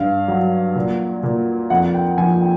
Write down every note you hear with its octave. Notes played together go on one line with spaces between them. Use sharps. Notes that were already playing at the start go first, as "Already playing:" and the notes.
Already playing: G2 F5
F#3
A#2
A#2
F2 F#5
G5
F3 G#5
G5